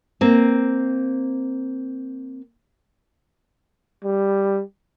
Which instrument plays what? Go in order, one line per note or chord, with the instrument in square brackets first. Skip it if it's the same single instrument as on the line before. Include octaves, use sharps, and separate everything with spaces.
[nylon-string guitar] A#3 C4
[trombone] G3